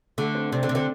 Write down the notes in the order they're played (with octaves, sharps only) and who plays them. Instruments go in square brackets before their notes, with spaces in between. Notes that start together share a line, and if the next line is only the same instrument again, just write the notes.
[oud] D3 [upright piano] A3
[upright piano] C4
[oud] C3 [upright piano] D4
[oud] D3 [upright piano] C4
[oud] C3
[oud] D3 [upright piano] C4